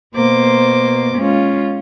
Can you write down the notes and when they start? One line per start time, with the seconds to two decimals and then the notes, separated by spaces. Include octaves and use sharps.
0.15 B2 A#3 C5 D6
1.17 G#3 C#4 F4